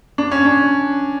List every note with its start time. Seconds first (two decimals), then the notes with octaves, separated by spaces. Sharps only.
0.18 D4
0.31 C#4
0.46 D4